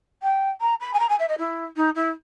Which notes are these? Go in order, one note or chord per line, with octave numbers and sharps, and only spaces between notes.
G5
A#5
B5
G#5
A#5
G#5
E5
D#5
E4
D#4
E4